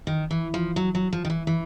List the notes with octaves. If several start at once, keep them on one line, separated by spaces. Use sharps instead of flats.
D#3
E3
F3
F#3
F#3
F3
D#3
E3
E3